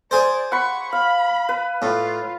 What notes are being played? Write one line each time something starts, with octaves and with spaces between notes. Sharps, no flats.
G#4 C5 D5
F#5 B5 C#6
F5 B5
B4
A2 F4